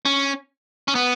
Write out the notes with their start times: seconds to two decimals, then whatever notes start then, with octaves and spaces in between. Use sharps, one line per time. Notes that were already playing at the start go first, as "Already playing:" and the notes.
0.05 C#4
0.88 C#4
0.95 B3